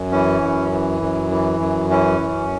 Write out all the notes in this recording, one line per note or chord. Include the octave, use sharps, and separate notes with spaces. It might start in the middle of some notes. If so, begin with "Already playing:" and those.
Already playing: F#2
E3 C#4
F#2
E3
F#2
E3
F#2
E3 C#4
F#2